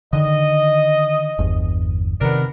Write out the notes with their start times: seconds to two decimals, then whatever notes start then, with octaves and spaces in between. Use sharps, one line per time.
0.13 D3 D#3 D#5
1.39 G1 E2
2.21 C3 D#3 B3 D4 A#4